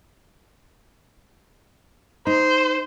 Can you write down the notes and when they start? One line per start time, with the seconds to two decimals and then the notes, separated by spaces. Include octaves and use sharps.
2.27 D#4 C5